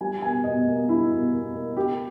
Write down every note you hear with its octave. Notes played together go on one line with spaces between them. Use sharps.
G3 G#5
B2 G#5
B2 D#5
A#3
G3 E4
B2
B2
A#3
A#3 G4